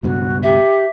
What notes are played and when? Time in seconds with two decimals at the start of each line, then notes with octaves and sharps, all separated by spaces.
0.03 C#2 G2 B2 F#4
0.43 G4 E5